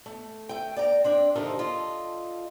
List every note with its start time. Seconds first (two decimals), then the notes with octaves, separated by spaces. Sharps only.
0.06 A3
0.49 A3 G5
0.77 D5 G5 A#5
1.04 C4 D4 D5
1.35 C3 D#3 F3 F4 A4 A#4
1.59 F4 A4 D#5